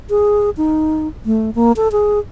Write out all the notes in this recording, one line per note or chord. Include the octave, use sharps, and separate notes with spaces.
G#4
D#4
A3
A#3
A4
G#4